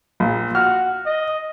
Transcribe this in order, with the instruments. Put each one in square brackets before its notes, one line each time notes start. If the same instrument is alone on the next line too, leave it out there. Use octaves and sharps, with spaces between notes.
[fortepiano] A#1 A#2
[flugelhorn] F#4 [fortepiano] F6
[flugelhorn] D#5